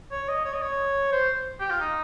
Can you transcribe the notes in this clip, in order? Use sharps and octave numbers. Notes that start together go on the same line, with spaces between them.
C#5
D#5
C#5
D#5
C#5
C5
G4
F4
D#4